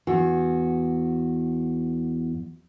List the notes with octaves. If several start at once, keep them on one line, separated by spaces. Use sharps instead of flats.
E2 F#4